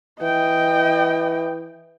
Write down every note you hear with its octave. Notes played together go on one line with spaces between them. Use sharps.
E3 D#5 G5